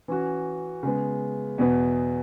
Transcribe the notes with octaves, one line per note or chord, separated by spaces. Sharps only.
E3 C#4 F#4
C#3 G#3 B3
E2 B2 B3